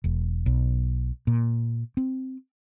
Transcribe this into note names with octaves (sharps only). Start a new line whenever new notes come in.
E1
B1
A#2
C4